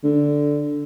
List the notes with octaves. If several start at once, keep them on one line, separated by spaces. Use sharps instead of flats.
D3